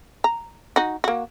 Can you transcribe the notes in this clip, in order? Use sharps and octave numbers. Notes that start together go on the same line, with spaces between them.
A#5
D#4 F#4
A#3 F#4